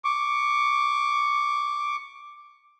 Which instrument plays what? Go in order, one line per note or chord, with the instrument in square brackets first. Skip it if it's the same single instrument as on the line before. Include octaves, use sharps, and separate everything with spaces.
[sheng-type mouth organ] C#6 D6